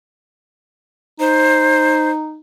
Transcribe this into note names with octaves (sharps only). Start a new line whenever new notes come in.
D#4 C5